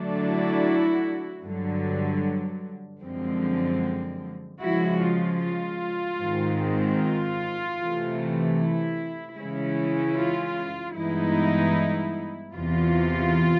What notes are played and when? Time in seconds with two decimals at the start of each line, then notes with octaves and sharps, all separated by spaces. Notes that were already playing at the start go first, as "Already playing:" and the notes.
Already playing: D3 F#3 A3 D4
0.24 E4 F#4
1.43 G2 D3 F#3
3.01 F#2 D3 F3 G#3 C4
4.60 C#3 F3 G#3 E4 F#4
5.00 F4
5.40 F4
6.18 G#2 D#3 G#3 C4
6.98 F4
7.77 C3 E3 A3
8.57 E4
9.36 C#3 E3 G#3 C#4 E4
10.15 F4
10.94 G2 E3 G#3 B3 D#4 E4
12.53 E2 C3 E3 F4